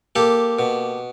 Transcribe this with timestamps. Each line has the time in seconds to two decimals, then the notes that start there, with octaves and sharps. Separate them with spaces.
0.16 A#3 G4 A4
0.59 B2